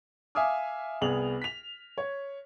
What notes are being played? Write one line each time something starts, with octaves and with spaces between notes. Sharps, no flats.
E5 F5 G#5 D6 D#6 F6
C2 B3 G#4 F7 F#7
B6 F7
C#5